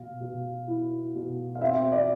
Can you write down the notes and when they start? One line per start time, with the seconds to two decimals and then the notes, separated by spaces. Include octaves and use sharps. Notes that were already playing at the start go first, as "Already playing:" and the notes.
Already playing: B2 F5
0.20 B2
0.67 E4
1.15 B2
1.55 F5
1.61 C4 E5
1.92 D5